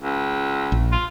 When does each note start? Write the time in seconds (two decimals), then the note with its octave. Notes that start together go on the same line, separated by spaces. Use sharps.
0.01 C#2
0.72 A#1
0.92 F4